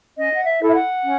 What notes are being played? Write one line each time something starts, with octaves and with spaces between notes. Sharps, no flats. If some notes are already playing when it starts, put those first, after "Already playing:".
C#4 D#5
F#5
E5
E4 A4
E5
F#5
C#4